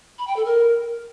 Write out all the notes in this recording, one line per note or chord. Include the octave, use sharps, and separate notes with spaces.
B5
G5
A4
A#4